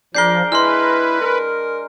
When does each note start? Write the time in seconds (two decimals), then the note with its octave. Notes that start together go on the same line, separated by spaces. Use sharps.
0.15 F3 D4 G#4 A#4 D5 G6 C7 G7
0.52 G#3 E4 B4 C6 F6
1.21 A#4